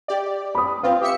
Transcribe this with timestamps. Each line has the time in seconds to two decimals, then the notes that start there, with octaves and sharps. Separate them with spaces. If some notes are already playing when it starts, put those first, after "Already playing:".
0.08 G4 D5
0.55 B5 D#6
0.83 C4 F4 B4 F5
1.01 G4 E5 C#7